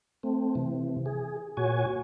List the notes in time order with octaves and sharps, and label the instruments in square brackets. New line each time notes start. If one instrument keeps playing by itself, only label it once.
[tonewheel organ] A3 C4
C3 E3
G#4
A#2 F#4 C#5 G#5